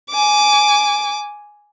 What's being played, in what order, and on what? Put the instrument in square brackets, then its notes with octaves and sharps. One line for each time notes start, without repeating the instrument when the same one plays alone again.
[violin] G#5 D6